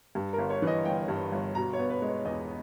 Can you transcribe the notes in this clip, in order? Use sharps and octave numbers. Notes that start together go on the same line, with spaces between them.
G2
A#4
G1
C#5
E3
D#5
G1 G5
G2
G1
B2 A#5
C#5
B3
B4
G#3
C#5
E2 D#5